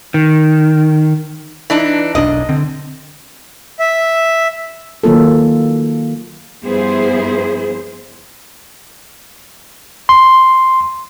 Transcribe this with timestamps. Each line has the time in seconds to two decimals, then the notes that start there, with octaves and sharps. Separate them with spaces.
0.14 D#3
1.70 E3 D4 D#4
2.15 E1 B1 D4 D#5
2.49 D3 C4
3.79 E5
5.04 D#3 F#3 A#3 F4 A4
6.64 G2 F3 B3 E4 G#4 C5
10.09 C6